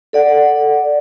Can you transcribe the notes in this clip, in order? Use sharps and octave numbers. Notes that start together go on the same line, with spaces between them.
A4 D5 F#5